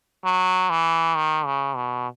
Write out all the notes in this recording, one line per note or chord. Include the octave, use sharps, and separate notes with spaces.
F#3
E3
D#3
C#3
B2